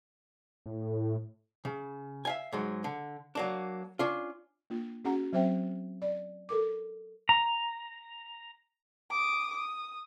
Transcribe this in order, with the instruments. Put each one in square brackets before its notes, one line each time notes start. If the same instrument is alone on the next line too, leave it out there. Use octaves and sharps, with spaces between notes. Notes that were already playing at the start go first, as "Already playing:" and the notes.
[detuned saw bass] A2
[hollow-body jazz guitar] C#3
E5 F5 G#5
G#2 F#3 G#3
D3
F#3 A#3 D4
C#4 D4 F4
[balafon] A#3 D4 F4
C#4 F#4 G#4 F#5 A#5
F#3 C4 C5 E5 G5
D5
A4 A#4 D6
[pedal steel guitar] A#5
[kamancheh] D6 D#6
D#6